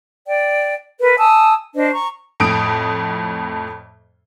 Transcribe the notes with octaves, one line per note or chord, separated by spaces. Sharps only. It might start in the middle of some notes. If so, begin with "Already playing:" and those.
D5 G5
A#4 B4
G#5 A5 D#6 E6
D4 C5 D#5
A#5 C#6
F2 A2 D#6 D7